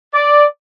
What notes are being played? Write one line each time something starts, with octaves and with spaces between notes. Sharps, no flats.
D5